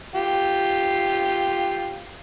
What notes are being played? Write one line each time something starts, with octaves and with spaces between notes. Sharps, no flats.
F4 G4